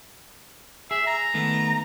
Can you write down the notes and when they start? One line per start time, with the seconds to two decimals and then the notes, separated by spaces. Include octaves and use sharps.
0.91 G#4 E5
1.07 A#5
1.34 D#3 A3 B3